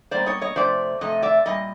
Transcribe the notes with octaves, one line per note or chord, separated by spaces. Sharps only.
B2 G3 A#3 C5 D5
C#5 D#5
C#5 D#5
C3 F3 A3 C5 D5
C3 F3 A3 D#5
D5 E5
A#2 G3 D#5